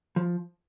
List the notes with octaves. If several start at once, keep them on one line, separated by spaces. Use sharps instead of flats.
F3